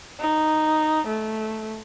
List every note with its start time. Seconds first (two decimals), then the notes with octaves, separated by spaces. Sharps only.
0.20 D#4
1.08 A3